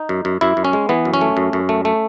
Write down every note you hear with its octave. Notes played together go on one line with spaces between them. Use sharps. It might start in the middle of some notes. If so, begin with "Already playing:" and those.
Already playing: D#4
F#2
F#2
F#2 E4
F#2
C#4
G#3
E3 B3
F#2
C#4
A3
F#2
F#2
A3
A3